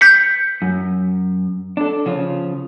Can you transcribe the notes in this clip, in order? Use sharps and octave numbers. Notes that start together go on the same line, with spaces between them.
G6 B6 C#7
F#2
D4 A4
C#3 F3 F4